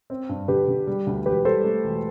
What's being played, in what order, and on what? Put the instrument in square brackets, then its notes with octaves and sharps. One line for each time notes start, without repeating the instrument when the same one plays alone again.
[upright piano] C4
G2
[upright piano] D3 [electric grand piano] G4 B4
[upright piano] D3
G3
D2
[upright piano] E1 [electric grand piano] G4 B4
[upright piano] G3 [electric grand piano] A4 C5
[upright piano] A3
E1